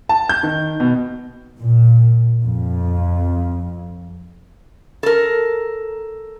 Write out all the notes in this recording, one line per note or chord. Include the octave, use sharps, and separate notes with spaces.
A5
G6
D#3
B2
A#2
F2
A4 A#4